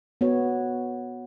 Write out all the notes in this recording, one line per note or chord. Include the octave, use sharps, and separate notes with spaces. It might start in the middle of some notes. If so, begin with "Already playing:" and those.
B3 F#4 C#5